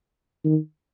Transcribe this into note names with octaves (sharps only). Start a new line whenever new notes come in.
D#3